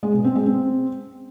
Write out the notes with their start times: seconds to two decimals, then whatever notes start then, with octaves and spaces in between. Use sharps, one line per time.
0.03 G#3
0.14 B2
0.24 C4
0.35 G#3
0.46 C4